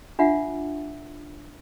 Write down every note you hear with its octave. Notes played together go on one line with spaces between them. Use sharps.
D4 F4 E5 F#5